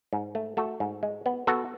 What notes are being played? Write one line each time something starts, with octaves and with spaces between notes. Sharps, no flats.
G#2
A3
A3 F#4 A4
G#2
G#3
B3
B3 F#4 A4